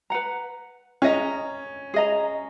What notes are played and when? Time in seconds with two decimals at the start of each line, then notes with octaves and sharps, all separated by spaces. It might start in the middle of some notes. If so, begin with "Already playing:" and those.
0.10 B4 F#5 A#5
1.02 C#4 G#4 D#5 A#5
1.94 G#4 D#5 A#5